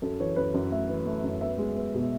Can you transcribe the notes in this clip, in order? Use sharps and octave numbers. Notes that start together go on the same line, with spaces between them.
F#2 A4
E3 C#5
F#2 B4
F#2
A3 E5
E3
A3
F#2
B3 E5
G#3
B3
B2